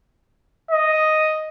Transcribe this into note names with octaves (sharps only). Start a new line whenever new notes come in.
D#5